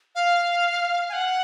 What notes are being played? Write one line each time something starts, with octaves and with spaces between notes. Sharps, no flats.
F5
G#5
F#5